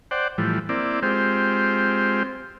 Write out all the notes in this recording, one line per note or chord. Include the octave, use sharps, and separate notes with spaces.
C5 D5 F#5 G5
A2 E3 F3 G3
A#3 C4 E4 D5
G#3 C4 F4 G4 C5